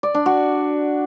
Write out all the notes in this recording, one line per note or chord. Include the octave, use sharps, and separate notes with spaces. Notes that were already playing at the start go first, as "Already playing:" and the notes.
D5
D4
F#4